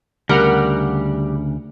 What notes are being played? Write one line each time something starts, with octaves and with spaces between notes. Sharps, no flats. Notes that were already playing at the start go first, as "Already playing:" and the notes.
D2 C#3 G3 A#4 F#5 F6